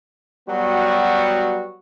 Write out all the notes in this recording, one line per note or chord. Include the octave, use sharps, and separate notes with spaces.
F#3 G3 B3 F#4